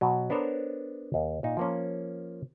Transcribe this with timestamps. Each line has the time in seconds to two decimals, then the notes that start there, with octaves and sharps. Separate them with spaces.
0.01 B2 F#3
0.30 B3 D4 A4 A#4 C5 C#5
1.14 D#2
1.43 A#2 D#4
1.57 F3 A#3 C#4